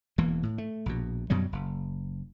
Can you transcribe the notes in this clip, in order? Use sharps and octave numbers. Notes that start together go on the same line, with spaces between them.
E1 E3 A#3
A2
A3
A#1 B2
F#2 B2 F#3 G3
F#1